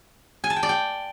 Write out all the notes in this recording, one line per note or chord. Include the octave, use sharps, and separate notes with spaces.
G#5
A5
G5
D5
G5